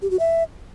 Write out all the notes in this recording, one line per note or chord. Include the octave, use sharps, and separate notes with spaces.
G4
F#4
E5